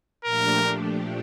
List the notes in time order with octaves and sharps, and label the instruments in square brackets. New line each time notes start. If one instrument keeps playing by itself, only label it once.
[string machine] A#2 F3 A3 D4 G4 [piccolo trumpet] A#4